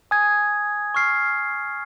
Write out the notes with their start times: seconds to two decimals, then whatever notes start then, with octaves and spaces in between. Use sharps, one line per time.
0.11 G#5 D#6 G#6
0.95 C#6 F6 C7